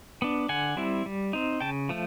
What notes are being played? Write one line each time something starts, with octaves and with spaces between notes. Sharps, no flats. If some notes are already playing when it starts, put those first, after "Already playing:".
B3 D4
D3 F#5 G#5
G3 C4 E4
G3
C4 D#4
C#3 G5 A5
F3 A3